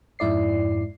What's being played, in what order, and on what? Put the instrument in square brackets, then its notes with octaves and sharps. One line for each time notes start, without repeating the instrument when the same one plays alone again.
[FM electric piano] F2 G#2 E4 D5 C7